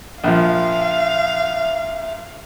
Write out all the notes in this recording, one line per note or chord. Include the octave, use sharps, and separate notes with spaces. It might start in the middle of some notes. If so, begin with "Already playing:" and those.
A#1 F3 E5 F5